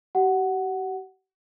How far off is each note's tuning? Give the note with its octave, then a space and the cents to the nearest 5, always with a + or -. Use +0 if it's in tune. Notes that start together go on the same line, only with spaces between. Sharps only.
G4 -40 F#5 +10